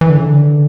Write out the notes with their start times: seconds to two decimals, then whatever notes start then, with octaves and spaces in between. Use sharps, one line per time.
0.01 E3
0.10 D3
0.17 C#3
0.24 D3